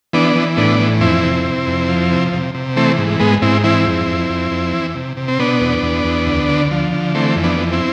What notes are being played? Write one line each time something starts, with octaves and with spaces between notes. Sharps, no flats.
E3 B3 D4
E3
A2 B3 D4
E3
F2 C4 E4
C3
C3
F2
F3
C3
C3
C3
E3 A3 C4
G#2
G#2 G#3 B3
G#2 C4 E4
E3 C4 E4
F2
F2
F2
F2
E3
C3
C3
C4
B2 B3 D4
E2
E2
E2
D2
D3
F3
D3
E3 A3 C4
F2
B3 D4
E3
C4 E4